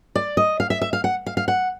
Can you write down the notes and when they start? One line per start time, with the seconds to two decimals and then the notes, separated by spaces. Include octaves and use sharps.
0.15 D5
0.37 D#5
0.60 F5
0.70 E5
0.82 E5
0.93 F5
1.04 F#5
1.26 F5
1.37 F5
1.48 F#5